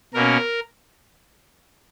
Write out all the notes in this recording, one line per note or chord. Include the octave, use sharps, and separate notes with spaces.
B2 A#3 C#4 A#4